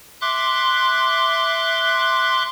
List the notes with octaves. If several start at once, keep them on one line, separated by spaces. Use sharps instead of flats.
E5 C6 D6 F#6